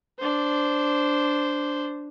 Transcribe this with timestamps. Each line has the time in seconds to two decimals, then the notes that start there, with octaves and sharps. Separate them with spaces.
0.19 D4 C5